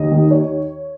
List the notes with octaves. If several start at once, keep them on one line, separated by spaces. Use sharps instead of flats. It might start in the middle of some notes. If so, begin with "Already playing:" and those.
Already playing: D#2 D#5
D#3
C#5